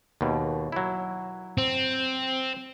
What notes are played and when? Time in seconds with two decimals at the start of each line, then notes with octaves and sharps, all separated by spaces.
0.21 D#2 B2
0.72 F#3 E4
1.58 C4